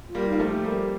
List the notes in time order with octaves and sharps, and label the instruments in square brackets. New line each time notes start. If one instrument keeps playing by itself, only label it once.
[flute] F4
[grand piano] G3 A#3
[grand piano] A#3 [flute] D#4
[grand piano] F3 A3
[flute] G4
[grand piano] G3 A#3 [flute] A4